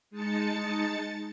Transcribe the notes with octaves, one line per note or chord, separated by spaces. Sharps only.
G#3 D#4 A5 A6 C#7